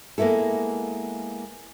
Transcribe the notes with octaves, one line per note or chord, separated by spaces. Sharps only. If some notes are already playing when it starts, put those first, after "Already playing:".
G#3 A#3 B3 E4 A4